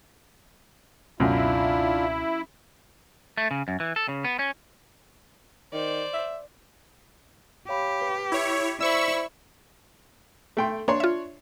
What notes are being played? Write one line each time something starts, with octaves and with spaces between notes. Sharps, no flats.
C#2 F#2 B2 C4 D4 E4 F4
A3
C#3
F#2
E3
A4
C#3
B3
C#4
D#3 C5 D5
E5
G4 C#5 F5 B5
B4
E4 C#5 G6
E4 C5 D5 B5 C#6 E6
A3 G5 C6
A#3 D4 C#5 C6
F4 E5